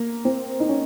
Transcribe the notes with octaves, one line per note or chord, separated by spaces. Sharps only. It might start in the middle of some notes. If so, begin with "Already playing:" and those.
Already playing: A#3
C4
D#4
C#4